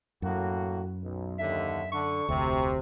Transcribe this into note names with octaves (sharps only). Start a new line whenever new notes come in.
F#2 A2 A#3 F#4
B1
D#2 D3 E5
D3 C#6
F1 D2 C3